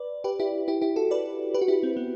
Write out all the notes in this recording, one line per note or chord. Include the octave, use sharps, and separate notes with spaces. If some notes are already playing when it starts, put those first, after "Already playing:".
Already playing: B4 D5
G4 B4
E4 G4
E4 G4
E4 G4
F#4 A4
B4 D5
G4 B4
F#4
E4 G4
C4
B3